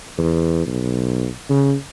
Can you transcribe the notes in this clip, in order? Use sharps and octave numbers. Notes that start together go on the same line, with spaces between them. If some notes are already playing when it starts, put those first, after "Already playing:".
E2
B1
C#3